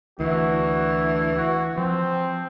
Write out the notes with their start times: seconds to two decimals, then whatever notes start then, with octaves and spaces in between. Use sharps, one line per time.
0.20 D2 E3 F#4
1.37 F#4
1.78 F3 C4